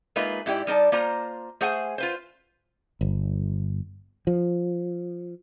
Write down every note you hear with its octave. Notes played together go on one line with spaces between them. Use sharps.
G#3 A#3 D#4 F4 B4 E5
G#2 E4 G4 D5
G3 D#4 D5 A5
A#3 F4 C5 A#5
A3 G#4 C5 F#5 G#5
F4 B4 C5
G1
F3